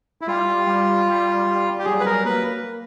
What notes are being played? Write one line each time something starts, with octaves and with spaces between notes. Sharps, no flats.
E4
G3 F4
G3
G3
G3
G4
F#3 G#4
B4
A#4
A#3 B4